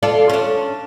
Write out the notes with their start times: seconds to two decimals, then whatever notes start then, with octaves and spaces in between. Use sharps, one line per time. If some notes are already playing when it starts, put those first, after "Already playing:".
0.03 F4 A4 D5
0.30 C#4 D4